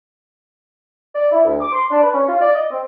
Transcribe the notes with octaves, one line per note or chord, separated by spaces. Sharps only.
D5
E4
D2
D6
C6
D4
B4
C#4
F4
D5
D#5
C4